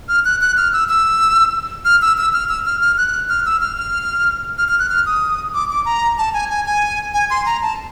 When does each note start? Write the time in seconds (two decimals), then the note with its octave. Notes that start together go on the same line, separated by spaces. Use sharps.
0.09 F6
0.25 F#6
0.41 F#6
0.57 F6
0.73 E6
0.89 E6
1.85 F6
2.02 E6
2.18 E6
2.33 F6
2.49 E6
2.66 F6
2.81 F6
2.98 F#6
3.29 F6
3.46 E6
3.61 F6
3.77 F6
4.58 F6
4.68 F6
4.79 F#6
4.90 F6
5.06 D#6
5.54 D6
5.70 D6
5.85 A#5
6.18 A5
6.34 G#5
6.50 G#5
6.66 G#5
7.14 G#5
7.30 C6
7.46 A#5
7.62 A5